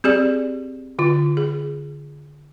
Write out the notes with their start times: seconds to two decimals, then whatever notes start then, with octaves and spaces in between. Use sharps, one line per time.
0.04 C4 G4 G#4 D5
0.99 D3 F4
1.37 G#4